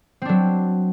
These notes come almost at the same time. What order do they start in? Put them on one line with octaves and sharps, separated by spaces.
C4 D4 F#3